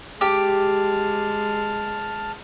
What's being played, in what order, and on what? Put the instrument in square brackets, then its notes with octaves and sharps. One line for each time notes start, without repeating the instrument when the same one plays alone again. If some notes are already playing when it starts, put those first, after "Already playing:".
[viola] G#3 [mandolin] G4 [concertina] A5 F6